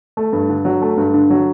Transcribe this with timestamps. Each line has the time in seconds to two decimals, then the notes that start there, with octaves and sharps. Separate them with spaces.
0.17 A3
0.33 G2
0.49 D3
0.65 F#3
0.82 A3
0.97 G2
1.14 D3
1.30 F#3